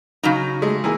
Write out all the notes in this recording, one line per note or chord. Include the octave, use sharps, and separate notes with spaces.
C#3 F#3 D#4
G#3 A3
E3 A#3 G#4